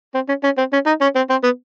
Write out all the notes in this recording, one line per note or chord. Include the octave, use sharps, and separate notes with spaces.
C4
C#4
C#4
C4
C#4
D#4
C#4
C4
C4
B3